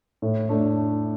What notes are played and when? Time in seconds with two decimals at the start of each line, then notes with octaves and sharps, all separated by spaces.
0.22 A2
0.49 A3 D4